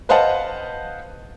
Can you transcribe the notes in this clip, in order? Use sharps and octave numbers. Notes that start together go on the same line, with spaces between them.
B4 C5 D#5 F5 F#5 A5